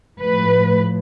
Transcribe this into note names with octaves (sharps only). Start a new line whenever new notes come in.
A2 F3 B4